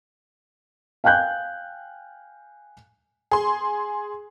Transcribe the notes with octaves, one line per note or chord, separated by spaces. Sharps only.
F5 G5 G#5 F#6 G6
G#4 C6